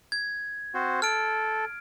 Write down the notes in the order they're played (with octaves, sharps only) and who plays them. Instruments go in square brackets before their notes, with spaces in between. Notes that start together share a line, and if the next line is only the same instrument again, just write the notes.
[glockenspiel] G#6
[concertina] C4 F#4 C5
[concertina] A4 [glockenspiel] F6 D7